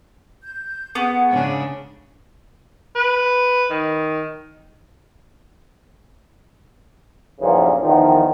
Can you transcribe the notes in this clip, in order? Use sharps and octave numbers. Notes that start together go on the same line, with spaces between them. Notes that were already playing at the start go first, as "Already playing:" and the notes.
G6
B3 G#4 F#5 C#6
G#2 C#3 D4
B4
D#3
B1 E2 G2 A#2 C#3 F3
E2 D#3 F3